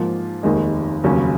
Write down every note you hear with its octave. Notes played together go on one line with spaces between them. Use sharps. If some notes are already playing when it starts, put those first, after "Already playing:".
Already playing: G#2 F3 A#3 F4
F1 D#2 D#3 G#3
F1 D#2 C#3 F#3 C#4